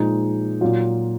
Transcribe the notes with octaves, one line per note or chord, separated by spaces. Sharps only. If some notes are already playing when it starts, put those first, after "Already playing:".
Already playing: A#2 F3 G#3 D#4
A#2 F#3 F4